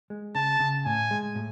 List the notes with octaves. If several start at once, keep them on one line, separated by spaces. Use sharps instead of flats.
G#3
C#3 A5
C#3
A2 G#5
G#3
A2